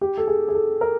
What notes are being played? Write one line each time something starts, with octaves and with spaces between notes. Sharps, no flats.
G4
A4
G#4
G#4
A4
A#4